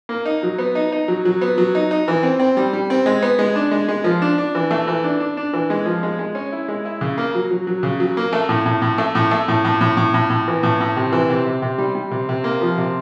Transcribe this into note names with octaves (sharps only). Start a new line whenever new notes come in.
A#3
D#4
F#3
B3
D#4
D#4
F#3
F#3
B3
F#3
D#4
D#4
E3
C4
C4
G3
G3
C4
G#3
B3
G#3
D4
G#3
G#3
F3
D4
D4
E3
A3
E3
D4
D4
D4
E3
G#3
F3
G#3
G#3
C#4
E4
G#3
E4
C#3
A#3
F#3
F#3
F#3
C#3
F#3
A#3
A3
A2
A2
A2
A3
A2
A3
A2
A2
A2
A2
A2
A2
E3
A2
A2
C3
E3
C3
C3
C3
G3
G3
C3
C3
A#3
F3
C3